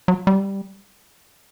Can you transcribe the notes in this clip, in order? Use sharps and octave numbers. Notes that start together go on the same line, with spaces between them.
F#3
G3